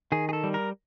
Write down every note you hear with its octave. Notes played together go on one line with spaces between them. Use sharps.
D#3 G#4
G#4
A4
G3
A#4